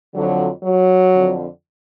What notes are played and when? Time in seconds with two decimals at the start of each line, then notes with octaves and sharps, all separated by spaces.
0.14 F2 D3 F#3
0.63 F#3
1.12 F2 D3